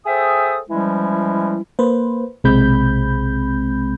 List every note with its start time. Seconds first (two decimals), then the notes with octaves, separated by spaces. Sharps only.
0.06 G#4 A4 C5 E5 G5 D#6
0.69 E3 F3 G3 G#3 C#4 E4
1.79 A#3 B4 C5
2.44 B1 C3 G#3 C4 B5 G6